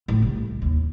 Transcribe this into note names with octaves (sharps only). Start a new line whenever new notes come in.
A2
C2
D#2